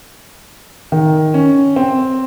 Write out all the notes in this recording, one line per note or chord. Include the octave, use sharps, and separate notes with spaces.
D#3
C#4
C4